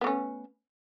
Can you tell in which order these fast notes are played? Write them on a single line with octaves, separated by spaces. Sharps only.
B3 A3 C#4